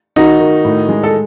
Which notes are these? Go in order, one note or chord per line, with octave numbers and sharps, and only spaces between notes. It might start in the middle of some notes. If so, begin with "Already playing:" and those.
D#3 D#4 F#4
D#3
A2
G#3
A4